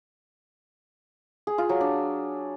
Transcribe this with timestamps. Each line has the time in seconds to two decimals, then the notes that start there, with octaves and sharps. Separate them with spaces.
1.47 G#4
1.58 F4
1.69 F#3
1.81 D4